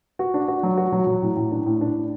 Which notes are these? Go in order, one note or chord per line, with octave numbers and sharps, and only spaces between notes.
F#4
D4
F#4
F#3
F#4
F#3
F#3
A2
A2
D4
A2
D4